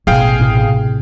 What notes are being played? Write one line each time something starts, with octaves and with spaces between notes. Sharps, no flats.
A1 B2 G#4 F5 G5
A2 C3